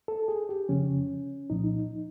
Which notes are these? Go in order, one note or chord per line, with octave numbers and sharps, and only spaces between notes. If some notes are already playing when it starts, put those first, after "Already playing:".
A4
G#4
G4
F2 C#3 F3 C#4
C2 A#2 F3 D#4